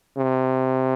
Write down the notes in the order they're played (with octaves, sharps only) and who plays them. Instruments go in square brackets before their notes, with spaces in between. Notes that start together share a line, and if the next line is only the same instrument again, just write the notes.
[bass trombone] C3